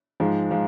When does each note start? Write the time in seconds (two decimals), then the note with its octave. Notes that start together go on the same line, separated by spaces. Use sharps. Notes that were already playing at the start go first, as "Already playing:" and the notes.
0.20 G#2 F3 G#3
0.51 F3 G#3